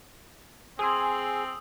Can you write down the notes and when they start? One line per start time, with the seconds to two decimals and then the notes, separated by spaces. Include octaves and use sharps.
0.79 C4 G#4 G#5 C6 D#6 E6